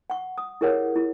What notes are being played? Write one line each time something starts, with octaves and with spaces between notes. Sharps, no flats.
F#5 C#6
D#6
E4 G4 G#4 A#4 C#5 F#5
E4